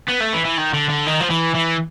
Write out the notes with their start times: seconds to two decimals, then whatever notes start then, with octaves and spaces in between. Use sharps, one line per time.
0.08 B3
0.20 A3
0.33 E3
0.45 E3
0.57 D#3
0.74 D3
0.89 D3
1.07 D#3
1.21 F3
1.30 E3
1.55 E3